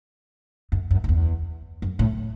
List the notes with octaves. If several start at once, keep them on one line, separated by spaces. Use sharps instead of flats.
F#2
F#2
F#2
E2
F#2
A2